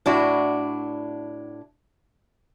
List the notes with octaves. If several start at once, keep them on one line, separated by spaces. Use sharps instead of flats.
A2 D4 E4 F#4